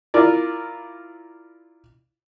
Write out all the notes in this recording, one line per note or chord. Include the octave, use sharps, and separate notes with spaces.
E4 F4 A#4 D5